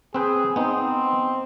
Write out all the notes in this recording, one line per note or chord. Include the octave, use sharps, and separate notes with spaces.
C4 G#4 B4 G5
B3 C4 D#4